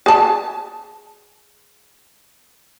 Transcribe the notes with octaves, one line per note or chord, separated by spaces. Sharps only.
G#4 A5